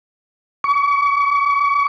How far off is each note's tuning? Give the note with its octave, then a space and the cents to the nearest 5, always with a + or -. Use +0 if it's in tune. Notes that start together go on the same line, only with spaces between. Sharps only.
C#6 +40